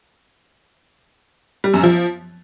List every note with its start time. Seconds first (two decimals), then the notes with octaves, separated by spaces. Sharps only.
1.64 G3
1.74 F#2
1.83 F3